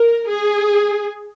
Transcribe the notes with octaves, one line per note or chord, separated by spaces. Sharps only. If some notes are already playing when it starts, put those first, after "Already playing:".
Already playing: A#4
G#4